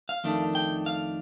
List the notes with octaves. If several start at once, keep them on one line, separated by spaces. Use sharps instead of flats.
F5
F2 D#3 A3 D4
G5
F5